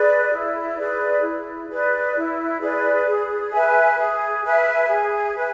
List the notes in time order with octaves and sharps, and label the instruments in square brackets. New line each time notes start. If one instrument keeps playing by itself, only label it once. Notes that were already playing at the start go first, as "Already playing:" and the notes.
Already playing: [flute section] G#4 B4 D5
E4
G#4 B4 D5
E4
G#4 B4 D5
E4
G#4 B4 D5
G#4
B4 E5 G#5
G#4
B4 E5 G#5
G#4
B4 E5 G#5